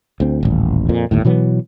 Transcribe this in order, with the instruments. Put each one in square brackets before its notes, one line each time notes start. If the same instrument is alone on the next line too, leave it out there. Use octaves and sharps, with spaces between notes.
[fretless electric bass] D2 C4
D#1 A1
F2 A#2
G1 D#2 A2
B2 E3 F#3 B3